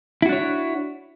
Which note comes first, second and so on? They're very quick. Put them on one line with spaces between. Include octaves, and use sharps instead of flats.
E4 F#4 D4 C#5